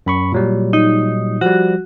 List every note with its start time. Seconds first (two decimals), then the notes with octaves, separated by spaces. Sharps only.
0.06 F#2 B5 C#6
0.32 A#2 F#3 G3
0.73 D#4
1.41 F3 G3 F#4